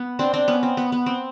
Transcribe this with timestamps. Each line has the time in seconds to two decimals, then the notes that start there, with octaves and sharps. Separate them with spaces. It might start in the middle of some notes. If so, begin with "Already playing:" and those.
Already playing: B3
0.19 C4 D4
0.34 C4 D4
0.48 B3 C#4
0.63 C4
0.77 B3
0.92 B3
1.06 C4